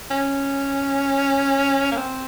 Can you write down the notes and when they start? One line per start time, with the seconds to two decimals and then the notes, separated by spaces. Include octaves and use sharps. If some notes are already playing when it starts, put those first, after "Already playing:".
0.11 C#4
1.91 A#3
1.97 C4